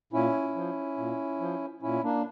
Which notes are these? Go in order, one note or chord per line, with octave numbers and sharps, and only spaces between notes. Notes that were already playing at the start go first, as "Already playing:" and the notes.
A#2 C#4 E4
F3
A#2
F3
A#2 C#4 E4
A#3 D4